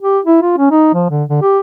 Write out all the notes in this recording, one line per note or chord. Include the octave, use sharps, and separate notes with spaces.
G4
E4
F4
C#4
D#4
F3
D3
D3
G4